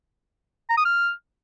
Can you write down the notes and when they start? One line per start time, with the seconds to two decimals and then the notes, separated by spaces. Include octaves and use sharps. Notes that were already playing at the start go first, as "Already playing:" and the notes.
0.70 A#5
0.78 D#6
0.85 F6